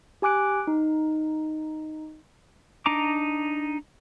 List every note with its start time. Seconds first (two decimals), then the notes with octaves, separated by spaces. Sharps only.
0.22 G4 G#5 D6 F#6 D7
0.67 D#4
2.86 D4 D#4 A#5 D6